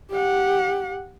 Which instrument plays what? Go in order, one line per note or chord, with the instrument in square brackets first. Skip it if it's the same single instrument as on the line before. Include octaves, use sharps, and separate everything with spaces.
[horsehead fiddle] G4 F#5